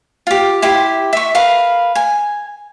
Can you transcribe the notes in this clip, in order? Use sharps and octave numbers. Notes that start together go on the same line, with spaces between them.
F4 G4
E4 G4 C6
E5 C#6
A#4 B4 F5 B5
G#5